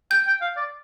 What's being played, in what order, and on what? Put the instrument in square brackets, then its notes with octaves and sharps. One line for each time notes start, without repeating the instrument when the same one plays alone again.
[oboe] G5 [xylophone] G6
[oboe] G5
F5
D5